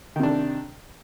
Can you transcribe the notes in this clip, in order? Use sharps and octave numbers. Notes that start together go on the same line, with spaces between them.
C3 D#3 D4